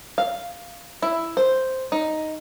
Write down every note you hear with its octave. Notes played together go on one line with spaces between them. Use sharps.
F5
E4
C5
D#4